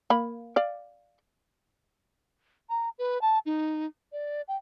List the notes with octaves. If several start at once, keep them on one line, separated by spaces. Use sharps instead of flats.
A#3 B5
D5 F5
A#5
B4
A5
D#4
D5
G5